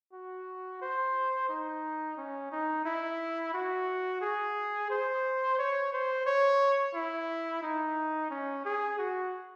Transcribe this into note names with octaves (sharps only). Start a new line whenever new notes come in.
F#4
C5
D#4
C#4
D#4
E4
F#4
G#4
C5
C#5
C5
C#5
E4
D#4
C#4
G#4
F#4